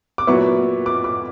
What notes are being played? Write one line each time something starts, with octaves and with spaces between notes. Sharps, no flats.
D6
A#2 F#3 B3 E4 C#6
D6
D6